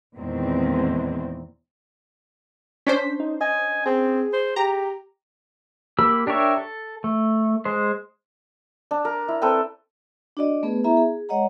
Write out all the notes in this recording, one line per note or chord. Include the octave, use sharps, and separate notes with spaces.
E2 A#2 D#3 G#3 C4
C#4 D4 C5 B6
D#4
D#5 G#5
C4 G#4
C5
G4 A#5
A#3 G4 B5 E6
D4 G4 A#4 C#5 E5
A4
A3
G#3 C5
D4
A#4
E4
C4 A4 B4 G5
D4 F#4 D5 D#5
A3 B3 G#4 B4
B3 E4 G#4 E5 A#5
G#4
G#3 C#5 D#5 F#5 A#5